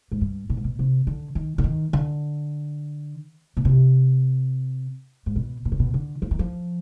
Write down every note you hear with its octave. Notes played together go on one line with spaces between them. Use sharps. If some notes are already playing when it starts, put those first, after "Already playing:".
G#2
G2
B2
G#2
B2
C3
D3
D#3
D3
D#3
D3
B2
C3
G#2
B2
B2
C3
B2
D3
F3
D#3
F3